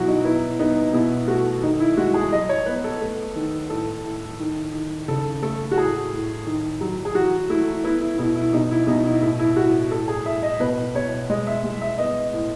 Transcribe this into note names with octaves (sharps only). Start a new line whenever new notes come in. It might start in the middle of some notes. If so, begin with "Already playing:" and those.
Already playing: B2 F#3 E4 F#4
D#4
B3 E4
B3 D#4
B2 E4
A3 F#4
D#3 D#4
E4
G#3 F#4
G#4
F#3 D#5
C#5
B3 B4
A4
A3
D#3
A2 A4
A2
D#3
D#3
C#3 A4
A3 A4
F#4
A2 G#4
A2
D#3
F#3
G#4
E3 F#4
A3 E4
B3 E4
E4
B2 E4
E4
B2 D#4
E4
B2 D#4
E4
A2 E4
E4
A2 F#4
A2 A4
G#4
A2 E5
D#5
B2 B4
B2 C#5
G#3 D#5
E5
G#3
E5
B3 D#5
A2